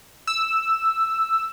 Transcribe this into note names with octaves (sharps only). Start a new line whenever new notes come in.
E6